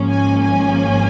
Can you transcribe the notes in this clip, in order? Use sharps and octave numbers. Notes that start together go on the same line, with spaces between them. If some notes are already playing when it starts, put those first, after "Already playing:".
Already playing: G#1 G#2 F3 A#3 C#4
G#5
G#5